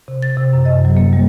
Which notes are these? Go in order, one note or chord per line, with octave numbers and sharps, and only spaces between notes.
C3
A6
C3
F#2
D#5
F#3
A#3
G3